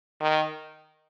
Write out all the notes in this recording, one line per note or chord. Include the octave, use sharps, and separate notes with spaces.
D#3